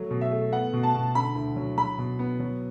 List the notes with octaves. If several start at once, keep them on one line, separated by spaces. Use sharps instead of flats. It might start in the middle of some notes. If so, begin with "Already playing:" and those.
Already playing: F#3 A3
B2
E5
A3
B3 F#5
B2
A5
B2
D3 B5
D2
F#3
F#3 B5
B2
B3
F#3